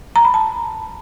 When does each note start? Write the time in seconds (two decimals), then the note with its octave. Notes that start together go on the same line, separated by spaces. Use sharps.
0.16 A#5
0.25 B5
0.34 A5